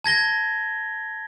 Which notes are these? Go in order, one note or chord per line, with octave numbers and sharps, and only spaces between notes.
A5 G#6 A#6 G7